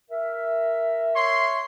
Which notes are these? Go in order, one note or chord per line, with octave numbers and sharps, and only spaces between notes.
A#4 E5
C#5 C6